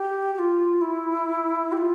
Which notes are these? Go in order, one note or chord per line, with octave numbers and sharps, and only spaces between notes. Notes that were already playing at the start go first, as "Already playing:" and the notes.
Already playing: G4
G4
F4
E4
G4
F4